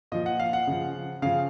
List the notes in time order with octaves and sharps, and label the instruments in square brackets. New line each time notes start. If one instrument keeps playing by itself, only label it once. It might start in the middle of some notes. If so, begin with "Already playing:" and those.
[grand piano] A#2 F3 D#5
F#5
F5
F#5
C#3 F3
C#3 F3 F5